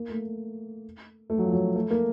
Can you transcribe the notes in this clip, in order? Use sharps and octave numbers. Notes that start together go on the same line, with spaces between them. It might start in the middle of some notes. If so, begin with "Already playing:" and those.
Already playing: A#3
A3
A3
F#3
F3
F#3
A3
A#3